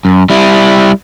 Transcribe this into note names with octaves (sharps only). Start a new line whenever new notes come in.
F#2
G3 E4